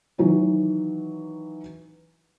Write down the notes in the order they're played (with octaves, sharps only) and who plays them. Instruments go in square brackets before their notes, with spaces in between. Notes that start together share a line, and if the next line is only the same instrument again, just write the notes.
[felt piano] D#3 E3 F#3